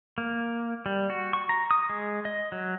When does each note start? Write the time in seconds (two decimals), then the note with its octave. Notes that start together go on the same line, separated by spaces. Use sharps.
0.18 A#3
0.86 G3
1.10 F#4
1.33 C#6
1.49 A#5
1.71 D#6
1.90 G#3
2.25 D#5
2.52 F#3